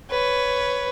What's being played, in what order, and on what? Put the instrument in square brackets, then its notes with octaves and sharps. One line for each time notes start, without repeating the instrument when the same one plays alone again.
[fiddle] B4 C#5